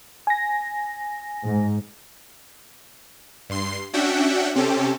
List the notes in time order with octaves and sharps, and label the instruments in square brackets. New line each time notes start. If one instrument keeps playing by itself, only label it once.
[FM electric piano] G#5 A#6
[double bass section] G#2
[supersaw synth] G2 C6 C7
C#4 D4 F#4 E5 F#5 G5
C3 C4 C#4 G4 A4